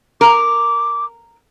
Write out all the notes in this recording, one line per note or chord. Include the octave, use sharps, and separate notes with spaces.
A#4 D6